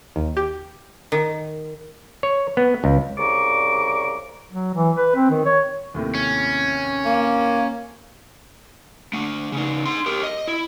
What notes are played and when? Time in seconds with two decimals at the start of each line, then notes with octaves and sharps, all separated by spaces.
0.16 D#2
0.37 G4
1.12 D#3
2.23 C#5
2.57 B3
2.84 C#2
3.18 C2 C#3 D5 A#5 C#6 D6
4.51 F#3
4.74 E3
4.97 B4
5.15 C4
5.31 D#3
5.46 C#5
5.94 D#2 A2 C3
6.15 C#4
7.05 A#3
9.13 A3 D4
9.52 C#3 D#4
9.86 D#4 C6
10.06 G4 A#4
10.23 D#5
10.47 E4